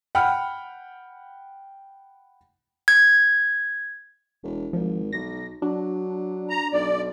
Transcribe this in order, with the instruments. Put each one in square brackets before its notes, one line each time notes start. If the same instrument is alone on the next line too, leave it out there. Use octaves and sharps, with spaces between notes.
[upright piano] F#5 G5 B5 F6
[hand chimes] G#6
[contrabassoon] E1
[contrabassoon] G#1 [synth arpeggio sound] F3
[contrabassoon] B1 [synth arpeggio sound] A#6
[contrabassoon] F#3 [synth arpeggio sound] D4
[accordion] A#5
[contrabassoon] B1 [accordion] D5